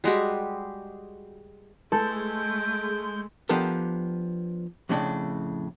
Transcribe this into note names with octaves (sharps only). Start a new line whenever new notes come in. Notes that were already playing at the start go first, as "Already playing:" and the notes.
G3 G#3 F#4 G4
G#3 A3 A4 G6
F3 B3 D4 G4 A4 A#4
F2 A2 C#3 D4